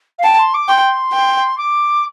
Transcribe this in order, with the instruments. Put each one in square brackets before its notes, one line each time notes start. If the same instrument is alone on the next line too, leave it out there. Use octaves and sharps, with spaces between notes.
[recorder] F5
[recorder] G5 [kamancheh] A5
[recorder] C6
D6
[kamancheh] G5 [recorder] C6
[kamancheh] G5
[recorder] D6